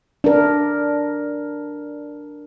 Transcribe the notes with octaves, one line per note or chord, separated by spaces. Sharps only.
D4 A#4